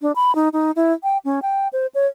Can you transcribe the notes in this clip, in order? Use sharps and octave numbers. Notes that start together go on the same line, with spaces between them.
D4
B5
D#4
D#4
E4
G5
C#4
G5
C5
C#5